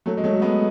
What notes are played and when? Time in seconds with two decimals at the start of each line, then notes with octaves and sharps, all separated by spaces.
0.06 F#3 A3
0.17 G#3
0.24 F#3 A3
0.42 G#3 B3